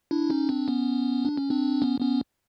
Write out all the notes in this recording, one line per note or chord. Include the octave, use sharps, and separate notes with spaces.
D4 E4
C#4 D#4
C4 D4
B3 C#4
D4
C#4
C4 D4
B3 C#4
B3 C#4